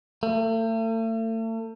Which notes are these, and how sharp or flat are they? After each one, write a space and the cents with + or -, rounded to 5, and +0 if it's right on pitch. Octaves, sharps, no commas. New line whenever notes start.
A3 +40